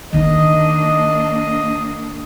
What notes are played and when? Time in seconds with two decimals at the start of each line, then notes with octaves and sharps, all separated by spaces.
0.13 D#3 A#3 D4 D#4 D#5